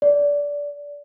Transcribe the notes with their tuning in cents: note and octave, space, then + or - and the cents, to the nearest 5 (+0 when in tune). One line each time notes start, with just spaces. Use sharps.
D5 -20